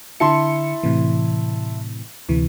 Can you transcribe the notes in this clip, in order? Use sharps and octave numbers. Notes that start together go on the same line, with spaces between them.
D3 E4 A5 C6 C#7
A2 C3 E3
D2 C3 E3